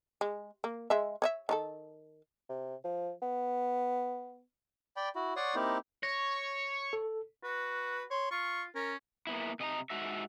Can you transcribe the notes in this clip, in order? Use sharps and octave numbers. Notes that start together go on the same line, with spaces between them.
G#3
A#3
G#3 E5
C#5 D#5 E5
D#3 D#4 A4
C3
F3
B3
D5 G5 B5
E4 F#4
C#5 D5 F#5 C6 C#6 D#6
A#3 C4 D#4 E4 G4
C#5 A#6
A4
F#4 B4
C#5 C6
F4 C#6
C#4 A#4
A#3 B3 E4
C3 D#5 G#5 A#5
G#2 F#4 E5